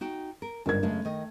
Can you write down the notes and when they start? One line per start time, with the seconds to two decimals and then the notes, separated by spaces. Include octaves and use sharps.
0.01 D#4 F#4 G5
0.42 A#4
0.66 G1 D2 G#2 A#4 G#6
0.83 F#2 C#3 G#3 A3
1.05 D#3 D#5